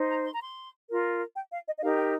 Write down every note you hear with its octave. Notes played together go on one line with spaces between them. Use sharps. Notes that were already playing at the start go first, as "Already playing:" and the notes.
Already playing: D#4 C5
A#5
C6
A#5
C6
F4 A#4
G5
F5
D#5
D#5
D#4 G4 A#4 F5
G5